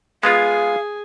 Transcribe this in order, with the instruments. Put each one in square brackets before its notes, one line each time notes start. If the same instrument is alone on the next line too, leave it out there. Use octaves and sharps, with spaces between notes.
[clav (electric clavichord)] G#3 B3 F4 [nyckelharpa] G#4 G#5 [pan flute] F5